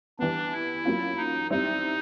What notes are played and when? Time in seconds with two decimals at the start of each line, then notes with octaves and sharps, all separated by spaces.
0.19 E3 G3 B3 D4
0.52 E4
0.85 F#3 A#3 C#4 F4
1.17 D#4
1.50 G3 C4 D#4 E4